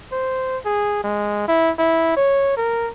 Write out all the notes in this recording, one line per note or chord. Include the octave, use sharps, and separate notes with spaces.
C5
G#4
G#3
E4
E4
C#5
A#4